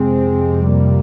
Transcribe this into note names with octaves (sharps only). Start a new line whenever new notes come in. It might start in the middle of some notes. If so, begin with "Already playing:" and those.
Already playing: F2 C3 G#3 C4
G3 A#3